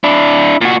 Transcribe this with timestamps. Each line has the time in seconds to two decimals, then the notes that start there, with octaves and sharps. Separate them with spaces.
0.04 D4 E4
0.61 A#2 F#4